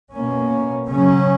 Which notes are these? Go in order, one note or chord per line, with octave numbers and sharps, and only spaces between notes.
B2 A#3 C#4
C#3 F#3 C#4